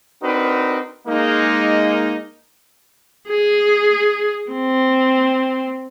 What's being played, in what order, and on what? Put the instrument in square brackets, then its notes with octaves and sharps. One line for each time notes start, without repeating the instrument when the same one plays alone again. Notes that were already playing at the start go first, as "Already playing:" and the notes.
[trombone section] C4 D4 D#4 F#4 A#4 B4
G#3 A#3 D#4
[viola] G#4
C4